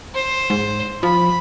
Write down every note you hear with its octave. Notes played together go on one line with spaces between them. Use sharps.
C5
G#2
F3 B5